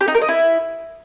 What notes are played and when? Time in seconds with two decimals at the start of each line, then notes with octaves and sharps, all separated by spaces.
0.01 G4
0.08 D#4
0.15 A#4
0.22 D#5
0.29 E4